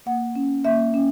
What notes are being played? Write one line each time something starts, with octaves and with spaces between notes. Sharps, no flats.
A#3 F#5
C#4
A#3 E5
C#4